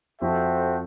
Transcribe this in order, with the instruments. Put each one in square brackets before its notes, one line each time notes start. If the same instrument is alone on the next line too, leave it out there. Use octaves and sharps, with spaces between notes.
[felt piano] F2 F3 [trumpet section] F#4 A4 C5 E5 G5